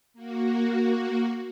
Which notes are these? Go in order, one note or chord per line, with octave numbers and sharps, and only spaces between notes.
A#3 F#4